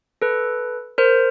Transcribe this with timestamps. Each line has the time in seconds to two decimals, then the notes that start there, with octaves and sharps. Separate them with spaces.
0.22 A4 B4
0.98 A#4 C5